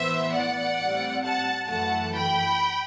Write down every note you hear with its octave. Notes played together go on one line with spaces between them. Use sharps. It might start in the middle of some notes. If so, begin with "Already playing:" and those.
Already playing: A2 E3 B3 C5 E5
D5 F#5
A2 G3 C4
F#5 A5
F#2 E3 A3 F#5 A5
G5 B5